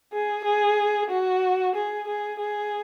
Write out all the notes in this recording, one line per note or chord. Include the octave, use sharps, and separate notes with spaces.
G#4
G#4
F#4
G#4
G#4
G#4